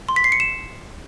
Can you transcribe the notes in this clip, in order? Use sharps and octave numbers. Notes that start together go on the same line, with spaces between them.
C6
B6
C7
C#7
E7